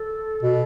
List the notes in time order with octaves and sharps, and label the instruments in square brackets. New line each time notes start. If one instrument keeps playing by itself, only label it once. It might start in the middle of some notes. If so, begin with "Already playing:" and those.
Already playing: [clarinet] A4
[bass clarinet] B2